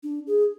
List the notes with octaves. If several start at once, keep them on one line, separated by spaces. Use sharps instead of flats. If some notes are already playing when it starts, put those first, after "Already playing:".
D4
G#4